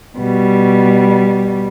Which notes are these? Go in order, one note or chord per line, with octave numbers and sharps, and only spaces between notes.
B2 G3